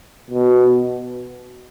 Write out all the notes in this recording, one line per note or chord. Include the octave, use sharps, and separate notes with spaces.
B2